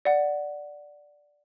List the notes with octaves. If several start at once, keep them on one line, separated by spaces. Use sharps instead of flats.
D5 F#5